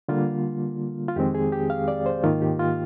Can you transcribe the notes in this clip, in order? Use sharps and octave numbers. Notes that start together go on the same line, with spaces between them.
D3 G3 A#3 F4
F4
F2 D#3 G#3 C4 G4
G#4
G4
F5
D5
C5
G#2 D#3 A#3 F4
G4
F4